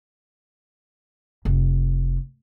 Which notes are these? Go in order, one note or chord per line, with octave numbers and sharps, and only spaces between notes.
F1